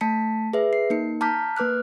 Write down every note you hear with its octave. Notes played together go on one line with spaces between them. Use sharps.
A3 A5 B6 C#7
G#4 B4 E5
C7
A#3 D#4 C#7
A5 A#5 D6 F6 G6 B6
A#3 B4 D6 F6 F#6